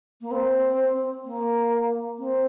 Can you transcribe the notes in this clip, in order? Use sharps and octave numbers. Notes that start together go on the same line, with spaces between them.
A#3
C4
A#3
C4